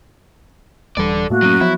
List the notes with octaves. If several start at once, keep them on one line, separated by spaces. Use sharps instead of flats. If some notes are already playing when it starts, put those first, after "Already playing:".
D#1 E3 G3 A4 D5
A2 A3 A#3 F#4
F#3 C#4
F3 F#3 B3 E4